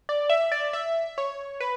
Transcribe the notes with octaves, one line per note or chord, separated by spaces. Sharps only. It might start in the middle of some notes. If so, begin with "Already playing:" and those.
D5
E5
D5
E5
C#5
B4